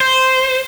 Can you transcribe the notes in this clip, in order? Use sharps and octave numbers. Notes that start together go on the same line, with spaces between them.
C5